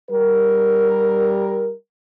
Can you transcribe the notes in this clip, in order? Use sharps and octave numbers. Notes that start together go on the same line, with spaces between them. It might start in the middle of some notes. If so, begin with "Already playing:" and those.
G3 A#4